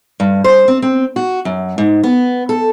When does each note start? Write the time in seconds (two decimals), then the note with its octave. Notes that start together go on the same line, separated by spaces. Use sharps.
0.20 G2
0.44 C5
0.68 C4
0.82 C4
1.16 F#4
1.45 F#2
1.78 G#2
2.03 B3
2.49 A4